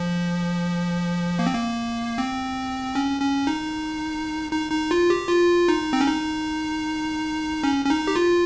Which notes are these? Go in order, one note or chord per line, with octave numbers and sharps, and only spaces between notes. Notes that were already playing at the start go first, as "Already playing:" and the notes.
Already playing: F3
A#3
C4
A#3
C4
C#4
C#4
D#4
D#4
D#4
F4
G4
F4
D#4
C4
C#4
D#4
C#4
C#4
D#4
G4
F4